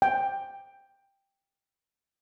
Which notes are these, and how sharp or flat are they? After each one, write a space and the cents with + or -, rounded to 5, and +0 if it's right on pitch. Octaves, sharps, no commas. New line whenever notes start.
G5 +10